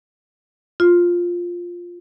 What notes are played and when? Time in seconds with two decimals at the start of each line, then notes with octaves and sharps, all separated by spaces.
0.80 F4